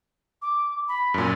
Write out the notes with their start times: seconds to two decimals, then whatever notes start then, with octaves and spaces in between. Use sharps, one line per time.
0.42 D6
0.88 B5
1.14 F#2 A#2